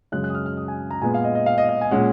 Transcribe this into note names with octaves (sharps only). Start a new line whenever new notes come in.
F#2 C#3 G#3 F#6
F#6
D#6
F6
F6
D#6
G#5
A#5
A#2 G#3 B3 G#5
F5
D#5
D#5
F5
D#5
D#5
G#5
A#2 G#3 C#4 F#5